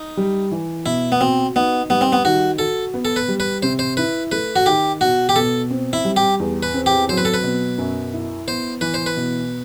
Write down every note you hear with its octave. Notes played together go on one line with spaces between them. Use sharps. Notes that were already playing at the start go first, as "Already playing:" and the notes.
Already playing: D#4
G3
E3
B2 E4
B3
C4 F#4
B3 D#4
G3 B3
C4
B3
D#3 F#4
F#4 A4
B3
A4
B4
G3
B4
C3 C5
C5
E4 B4
A3 B4
F#4
D#3 G4
B2 F#4
G4
B2 A4
C4
E4
G3
G4
E2
B4
C4
G4
F#3 C5
B4
A4
B4
B2
F#2
E4
B3 C5
E3 B4
C5
B4
B2